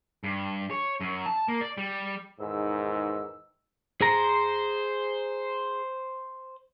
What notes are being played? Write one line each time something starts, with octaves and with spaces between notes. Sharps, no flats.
G2
C#5
F#2
A5
A#3
D5
G3
E2 G#2 D#3 E6
G#4 C5 A#5